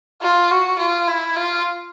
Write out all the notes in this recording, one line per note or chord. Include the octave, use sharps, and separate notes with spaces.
F4
F#4
F4
E4
F4